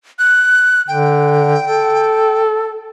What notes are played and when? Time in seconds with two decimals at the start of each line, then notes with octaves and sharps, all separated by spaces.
0.19 F#6
0.88 D3 G5
1.65 A4